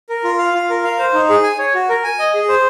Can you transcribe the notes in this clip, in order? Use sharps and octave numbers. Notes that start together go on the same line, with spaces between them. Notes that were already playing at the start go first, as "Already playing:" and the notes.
A#4
F4
F5
F4
A#4
F5
C5
D#4
G#4
G#5
C#5
F#4
A#4
G#5
D#5
G#4
C5